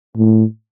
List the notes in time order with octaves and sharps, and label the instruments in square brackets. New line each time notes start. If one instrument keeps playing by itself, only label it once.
[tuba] A2